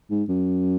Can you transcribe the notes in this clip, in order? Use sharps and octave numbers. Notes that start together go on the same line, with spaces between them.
G#2
F#2